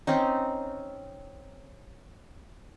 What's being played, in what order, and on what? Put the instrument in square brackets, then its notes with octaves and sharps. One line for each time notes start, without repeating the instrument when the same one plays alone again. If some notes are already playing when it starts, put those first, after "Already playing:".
[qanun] C4 C#4 D#4